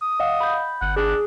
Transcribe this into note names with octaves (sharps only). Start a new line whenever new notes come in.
D#6
D#5 F5 F#5
B5 G6
G1 F#5
D4 G#4